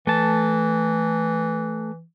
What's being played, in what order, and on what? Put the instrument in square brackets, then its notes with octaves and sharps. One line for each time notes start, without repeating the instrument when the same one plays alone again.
[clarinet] E3 [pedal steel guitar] A3 A5